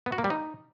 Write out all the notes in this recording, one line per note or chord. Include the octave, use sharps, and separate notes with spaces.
B3
F#4
A#3
G3
D#4